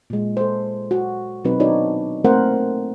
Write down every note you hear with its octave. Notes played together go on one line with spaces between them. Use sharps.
A#2 G#3
A4 C5
F#4
B2 F#3 C4 D#4 B4
D4 D#4 F#4 C#5 D5
A3 A#3 C4 A#4 C5 F#5